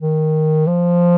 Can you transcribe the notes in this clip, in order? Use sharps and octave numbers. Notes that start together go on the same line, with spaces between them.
D#3
F3